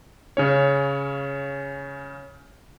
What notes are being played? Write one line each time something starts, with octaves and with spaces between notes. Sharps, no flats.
C#3 C#4 C#5